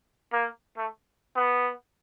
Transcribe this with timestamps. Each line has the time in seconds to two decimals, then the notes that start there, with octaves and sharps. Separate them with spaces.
0.33 A#3
0.77 A3
1.36 B3